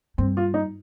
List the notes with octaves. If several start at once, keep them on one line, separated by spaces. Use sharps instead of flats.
G2 C4
F4
D#4